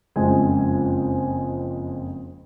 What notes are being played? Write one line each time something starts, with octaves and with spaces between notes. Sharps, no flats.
F#1 F2 G#3 C5 G#5